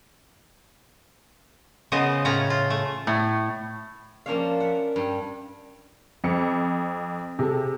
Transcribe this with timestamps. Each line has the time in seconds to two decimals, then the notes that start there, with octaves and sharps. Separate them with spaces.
1.92 C#3 B3 C5 D#5
2.25 A2 C#4 F4 A#5
2.50 F4
2.70 A3
3.07 A2
4.26 F3 A#3 C#4 D4 C#5 F5
4.60 E5 F#5
4.96 G2
6.24 F2 C4 C#7
7.39 C3 G#4 A4